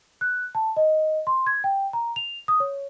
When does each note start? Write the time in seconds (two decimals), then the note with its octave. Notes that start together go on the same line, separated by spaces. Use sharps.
0.21 F#6
0.55 A5
0.77 D#5
1.27 C6
1.47 G#6
1.64 G5
1.93 A#5
2.16 F7
2.48 D#6
2.60 C#5